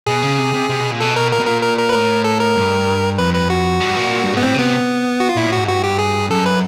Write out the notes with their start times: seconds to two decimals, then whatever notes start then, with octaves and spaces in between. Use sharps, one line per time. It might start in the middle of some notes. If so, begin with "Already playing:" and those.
0.07 B2 G#4
0.22 C#3
0.38 C3
0.54 C3
0.69 C3
0.80 B2
0.91 A#2
1.00 B2 A4
1.16 A#4
1.32 A#2 A#4
1.39 B2
1.46 A#2 A#4
1.62 A#4
1.79 A#4
1.89 B4
1.93 A2 A#4
2.24 A4
2.40 A#4
2.56 G2
3.18 F2 B4
3.34 B4
3.50 F#4
3.81 G2
3.97 A#2
4.24 G2
4.34 G#2 B3
4.43 A2 C4
4.54 C#3
4.59 C3 B3
5.20 F#4
5.29 F4
5.37 A#2 E4
5.47 A2
5.52 G#2 F#4
5.68 G2 F#4
5.84 G4
5.99 G#4
6.30 F#2 A4
6.46 B4